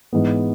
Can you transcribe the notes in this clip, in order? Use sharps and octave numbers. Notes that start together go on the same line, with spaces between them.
G#2 E3 B3